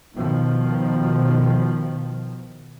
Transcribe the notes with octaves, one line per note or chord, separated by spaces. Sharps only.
B2 D#3 F3